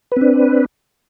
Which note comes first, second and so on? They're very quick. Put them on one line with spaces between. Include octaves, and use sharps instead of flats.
B4 C4 D4